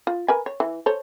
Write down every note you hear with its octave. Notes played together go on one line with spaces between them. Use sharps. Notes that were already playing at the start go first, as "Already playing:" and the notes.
F4
A#4 B4 G#5
C#5
E3
A4 C5 C#5